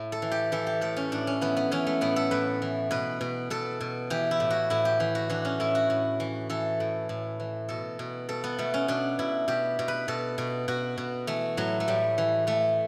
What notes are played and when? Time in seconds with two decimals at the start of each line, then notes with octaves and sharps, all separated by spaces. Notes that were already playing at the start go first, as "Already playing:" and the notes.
Already playing: A2 E4
0.12 A4
0.22 E3
0.31 G4
0.52 E3 A4
0.67 G4
0.81 A2 A4
0.97 C#4
1.12 A2 D4
1.27 C#4
1.41 E3 B3
1.57 B3
1.71 E3 C#4
1.87 A3
2.01 A2 B3
2.16 A4
2.31 A2 B4
2.62 E3
2.91 B2 B4
3.21 B2
3.50 B2 A4
3.80 B2
4.10 E3 G4
4.31 E4
4.40 A2
4.50 F#4
4.70 A2 E4
4.85 G4
5.00 E3
5.15 F#4
5.30 E3 D4
5.45 C#4
5.60 A2 E4
5.75 F#4
5.90 A2
6.20 E3
6.50 E3 A4
6.80 A2
7.09 A2
7.40 E3
7.69 B2 A4
7.99 B2
8.29 B2 A4
8.44 B3
8.59 B2 A3
8.74 C#4
8.88 B2 D4
9.19 B2 E4
9.48 B2 G4
9.79 B2
9.88 B4
10.08 B2 A4
10.38 B2
10.68 B2 F#4
10.98 B2
11.27 E3 A3
11.57 A2 F#3
11.80 A3
11.88 A2 G3
12.18 E3
12.47 E3 A3